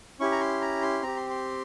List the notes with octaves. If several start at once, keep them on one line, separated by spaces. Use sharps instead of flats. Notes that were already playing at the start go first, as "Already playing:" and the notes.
C#4 E4 G4 C#6
A#5
C6
A#5
C6
C4 G4 A#5
C6
C6